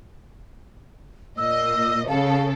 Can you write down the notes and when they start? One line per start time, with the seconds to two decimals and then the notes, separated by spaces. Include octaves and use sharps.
1.38 A#2 D#5 E6
2.08 C#3 A4 F5